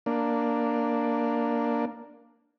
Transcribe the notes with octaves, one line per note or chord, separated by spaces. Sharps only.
A#3 D4